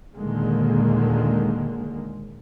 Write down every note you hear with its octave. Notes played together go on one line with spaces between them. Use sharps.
D#2 A#2 D3 D#3 G#3 A#3